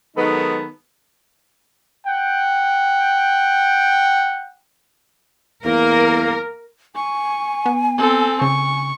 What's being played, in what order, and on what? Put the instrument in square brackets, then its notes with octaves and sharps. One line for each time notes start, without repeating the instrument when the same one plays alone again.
[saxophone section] D#3 F#3 G#3 B3 D#4 A4
[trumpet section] F#5 G5
[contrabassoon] E2 [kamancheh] A#3 [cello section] A#4
[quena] G#5 [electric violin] C#6
[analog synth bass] B3
[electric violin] C4 A4
[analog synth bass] C#3 [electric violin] C#6